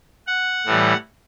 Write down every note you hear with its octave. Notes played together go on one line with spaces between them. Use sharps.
F#5
A2 E3 G3